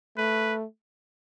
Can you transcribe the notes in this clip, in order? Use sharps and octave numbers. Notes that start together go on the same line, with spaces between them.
A3 B4